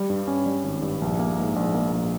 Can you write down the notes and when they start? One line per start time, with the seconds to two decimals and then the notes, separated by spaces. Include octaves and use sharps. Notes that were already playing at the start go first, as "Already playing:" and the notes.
Already playing: G3
0.10 G2
0.28 C#4
0.46 G3
0.64 G#1
0.82 G2
1.02 A#1
1.19 A#3
1.38 G#2
1.56 A#1
1.74 A#3
1.93 A#1